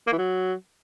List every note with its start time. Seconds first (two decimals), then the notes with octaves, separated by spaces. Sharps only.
0.07 A#3
0.12 E3
0.18 F#3